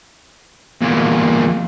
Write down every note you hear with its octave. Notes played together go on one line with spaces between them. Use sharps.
E2 A#2